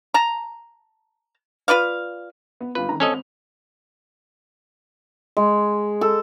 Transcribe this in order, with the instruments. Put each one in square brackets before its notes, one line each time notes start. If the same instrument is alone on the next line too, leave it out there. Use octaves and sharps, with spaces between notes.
[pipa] A5 A#5
F4 B4 D5 F5
[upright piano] B3
[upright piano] G1 F4 [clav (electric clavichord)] B4
[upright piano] A1 D#3 A#5
[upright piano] G#1 C4 F7 [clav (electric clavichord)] C#4 A4 D#5
[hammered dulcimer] G#3
A4